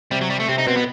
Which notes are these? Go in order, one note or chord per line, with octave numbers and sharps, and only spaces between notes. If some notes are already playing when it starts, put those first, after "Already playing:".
C3 G3
F#3
G3
A3
C3 C4
D#4
B2 C4
B3